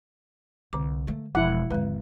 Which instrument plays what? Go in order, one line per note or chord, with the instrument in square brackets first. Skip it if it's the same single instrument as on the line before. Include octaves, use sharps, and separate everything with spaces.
[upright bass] C2 [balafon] D3 D6
[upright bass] A3 A#3
[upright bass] E1 [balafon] F3 [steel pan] E4 F#5
[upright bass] G#1 D#2 [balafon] D3 G#3 B4